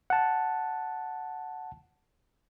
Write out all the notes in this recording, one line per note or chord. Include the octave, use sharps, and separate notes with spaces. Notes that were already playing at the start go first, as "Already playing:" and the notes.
F#5 A5